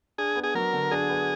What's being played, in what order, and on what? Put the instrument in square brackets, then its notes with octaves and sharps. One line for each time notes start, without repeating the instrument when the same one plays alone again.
[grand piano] D4 [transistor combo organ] G#4
[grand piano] B3
[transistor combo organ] G#4
[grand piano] F#3 [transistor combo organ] A#4
[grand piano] D3
[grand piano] D4 [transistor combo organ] G#4
[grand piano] B3